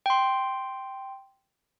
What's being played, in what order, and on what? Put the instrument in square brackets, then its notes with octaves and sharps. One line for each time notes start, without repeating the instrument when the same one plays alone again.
[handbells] G5 C6